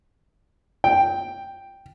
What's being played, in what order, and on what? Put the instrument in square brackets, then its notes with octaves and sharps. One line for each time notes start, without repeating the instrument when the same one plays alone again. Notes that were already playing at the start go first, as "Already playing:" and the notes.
[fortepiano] G5